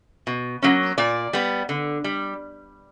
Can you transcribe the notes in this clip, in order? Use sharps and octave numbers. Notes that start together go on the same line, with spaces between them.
B2
F#3 A#3 C#4
A#2 D5
G3 B3
D3
G3